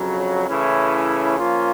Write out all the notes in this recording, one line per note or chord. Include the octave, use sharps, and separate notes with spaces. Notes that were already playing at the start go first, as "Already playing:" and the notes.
Already playing: F2 C#3 F#3
C#3 E3 A3 C#4 E4
F3 A#3 C#4 F4